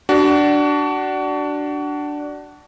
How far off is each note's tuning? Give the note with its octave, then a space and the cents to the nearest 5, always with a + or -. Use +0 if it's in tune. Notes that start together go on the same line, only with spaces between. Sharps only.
D4 +0 F#4 +30